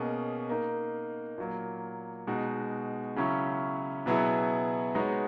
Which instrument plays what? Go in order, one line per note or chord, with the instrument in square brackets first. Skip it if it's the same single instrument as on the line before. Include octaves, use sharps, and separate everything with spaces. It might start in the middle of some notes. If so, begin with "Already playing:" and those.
Already playing: [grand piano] B2 A#3 C#4 G#4 D#5
A#3 D#4 A#4
A#2 F#3 A#3
B2 G#3 D#4 F#4
C#3 F#3 C#4 E4
B2 F#3 B3 E4 G#4
G#3 B3 D#4 F#4 C#5